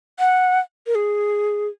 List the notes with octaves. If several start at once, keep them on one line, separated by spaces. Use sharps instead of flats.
F#5
A#4
G#4